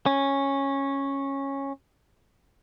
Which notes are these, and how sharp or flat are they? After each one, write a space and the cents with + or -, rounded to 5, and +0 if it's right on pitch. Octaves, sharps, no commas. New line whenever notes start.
C#4 -10